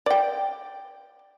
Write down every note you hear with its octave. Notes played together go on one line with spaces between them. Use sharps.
D5 G5